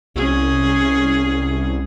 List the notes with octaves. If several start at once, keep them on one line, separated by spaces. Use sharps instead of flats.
C2 C#4 G#4